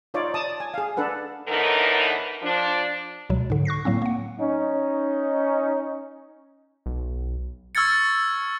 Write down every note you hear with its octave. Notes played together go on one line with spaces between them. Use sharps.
D#4 F4 C#5 D5
D5 A5 D#6
G#5
G#4 F5
D4 A4 B4 F#5
A2 D3 E3 B3 D#4 A#4
F3 D4
C#2 B2 F#3
G#2 D3
C#6 F#6 A#6 C7
A2 F#3 A#3 C4
A#3 F#5
C#4 D#4
B1
C#6 E6 F6 G#6 A6 C#7